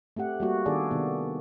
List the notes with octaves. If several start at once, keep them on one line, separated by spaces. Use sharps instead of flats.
A3 C4 G4 F#5
G3 A#3 F#4
D#3 B3 D4 G#4 A4 D5
C3 D#3 B3